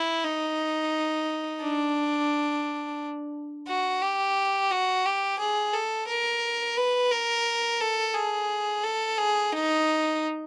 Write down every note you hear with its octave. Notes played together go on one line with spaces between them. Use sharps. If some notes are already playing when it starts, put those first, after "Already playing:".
Already playing: E4
D#4
D4
F#4
G4
F#4
G4
G#4
A4
A#4
B4
A#4
A4
G#4
A4
G#4
D#4